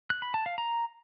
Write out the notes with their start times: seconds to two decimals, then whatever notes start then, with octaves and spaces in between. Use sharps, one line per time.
0.10 F#6
0.22 B5
0.34 A5
0.46 F5
0.58 A#5